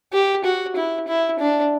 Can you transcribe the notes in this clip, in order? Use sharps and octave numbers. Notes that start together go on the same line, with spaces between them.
G4
F#4
E4
E4
D4